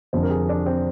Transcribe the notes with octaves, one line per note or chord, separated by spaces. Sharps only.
F1 F2 D3 C5
A#4
G#4
D4
C4